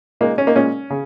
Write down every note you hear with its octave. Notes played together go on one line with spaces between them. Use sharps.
A#2 G#3 A#3 D#4
C#4
A#3 D#4
A#2 G#3 C#4
C#3